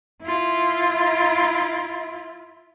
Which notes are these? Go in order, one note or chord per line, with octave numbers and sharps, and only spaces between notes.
E4 F4